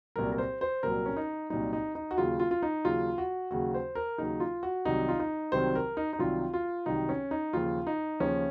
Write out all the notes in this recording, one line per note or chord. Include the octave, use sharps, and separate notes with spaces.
C2 A#2 F#3 A#4
A#4
C5
C5
C2 A#2 F#3 A#4
C#4
D#4
C2 A#2 F#3 D#4
D#4
D#4
F#4
D#2 C#3 F#3 F4
F4
F4
D#4
D#2 C#3 F#3 F4
F#4
D#2 C#3 F#3 F#4
C5
A#4
D#2 C#3 F#3 D#4
F4
F#4
C2 C3 D#3 F#3 D#4
F4
D#4
C2 C3 D#3 F#3 C5
A#4
D#4
D#4
C2 C3 D#3 F#3 F4
F4
C2 C3 D#3 F#3 D#4
C#4
D#4
D#2 C#3 F3 F4
D#4
D#2 C#3 F3 C#4